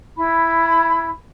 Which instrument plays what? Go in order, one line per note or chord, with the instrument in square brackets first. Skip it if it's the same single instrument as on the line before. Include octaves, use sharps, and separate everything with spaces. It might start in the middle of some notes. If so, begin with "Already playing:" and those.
[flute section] E4 B5